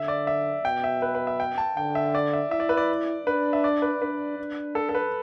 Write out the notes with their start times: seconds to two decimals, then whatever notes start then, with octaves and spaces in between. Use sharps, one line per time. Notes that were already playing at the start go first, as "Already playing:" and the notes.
Already playing: D3 E5
0.08 D5
0.27 E5
0.65 B2 G5
0.84 E5
1.02 B4
1.15 B4
1.27 E5
1.40 G5
1.58 A5
1.77 D3 G5
1.95 E5
2.15 D5
2.33 E5
2.51 E4 E5
2.60 D5
2.69 B4
2.77 D5
3.27 D4 B4
3.53 E5
3.64 D5
3.82 B4
4.01 D4 B4
4.38 D4
4.75 A4
4.89 A4
4.95 B4